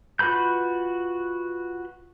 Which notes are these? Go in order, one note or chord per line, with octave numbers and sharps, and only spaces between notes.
F4 F#4 B4 B5 G6